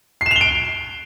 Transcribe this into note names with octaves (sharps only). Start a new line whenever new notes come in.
C7 D7 E7 F7 G7